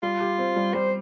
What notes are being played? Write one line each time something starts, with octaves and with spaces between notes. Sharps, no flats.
G3 F4
G4
C4
G3
G3 C5